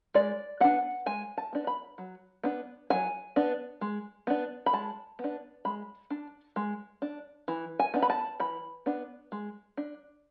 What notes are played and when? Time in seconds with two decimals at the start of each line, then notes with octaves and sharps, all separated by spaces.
0.14 G#3 D5
0.60 B3 D4 F#5
1.06 G#3 G#5
1.38 A5
1.53 B3 D4
1.67 B5
1.98 F#3
2.43 B3 D4
2.90 F#3 G#5
3.36 B3 D4
3.81 G#3
4.27 B3 D4
4.66 B5
4.73 G#3 A5
5.19 B3
5.24 D4
5.65 G#3 B5
6.10 D4
6.56 G#3
7.02 D4
7.48 E3
7.79 G#5
7.94 B3 D4
8.02 B5
8.10 A5
8.40 E3 B5
8.86 B3 D4
9.32 G#3
9.77 D4